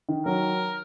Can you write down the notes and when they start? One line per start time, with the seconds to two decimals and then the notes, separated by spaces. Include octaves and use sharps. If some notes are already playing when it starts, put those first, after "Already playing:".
0.09 D#3
0.26 F#3 A#4